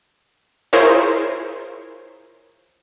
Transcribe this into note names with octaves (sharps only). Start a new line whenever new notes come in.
E4 F4 G#4 A#4 C5 C#5